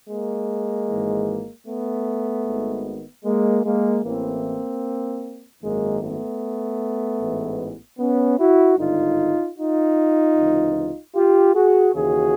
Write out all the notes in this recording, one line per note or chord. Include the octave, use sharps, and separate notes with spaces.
G#3 A#3
G#1 G#2 E3
A3 B3
G#1 G#2 D#3
G#3 A#3
G#3 A#3
A1 A2 E3 A#3 C4
G#1 F#2 D#3 G#3 A#3
A3 B3
A1 G#2 E3
B3 C#4
E4 F#4
G#1 G2 D3 D#4 F4
D#4 F4
C#2 C3 E3
F4 G4
F#4 G#4
D#2 C#3 E3 F#4 G#4